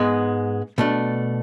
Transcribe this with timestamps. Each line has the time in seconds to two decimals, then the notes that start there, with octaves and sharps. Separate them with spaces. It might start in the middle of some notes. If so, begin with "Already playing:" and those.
Already playing: G#2 G#3 B3
0.78 B2 A3 D4